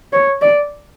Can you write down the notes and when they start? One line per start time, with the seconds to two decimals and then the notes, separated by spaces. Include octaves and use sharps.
0.13 C#5
0.41 D5